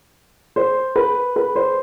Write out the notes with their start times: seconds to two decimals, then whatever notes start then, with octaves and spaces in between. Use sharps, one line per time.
0.56 C5
0.96 B4
1.36 B4
1.56 C5